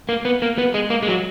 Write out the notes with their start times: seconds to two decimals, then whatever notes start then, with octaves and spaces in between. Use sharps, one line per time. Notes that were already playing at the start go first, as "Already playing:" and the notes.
0.09 A#3
0.25 B3
0.42 A#3
0.58 B3
0.74 G#3
0.90 A#3
1.03 G#3
1.08 F#3